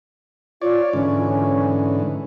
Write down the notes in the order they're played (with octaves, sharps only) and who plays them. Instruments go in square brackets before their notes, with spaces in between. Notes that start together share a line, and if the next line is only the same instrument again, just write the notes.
[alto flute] F4 [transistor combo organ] C#5 D5
[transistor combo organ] G#2 D3 E3 [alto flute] C#4